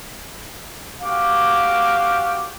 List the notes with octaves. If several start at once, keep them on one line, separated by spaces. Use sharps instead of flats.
F#4 G4 F5 D6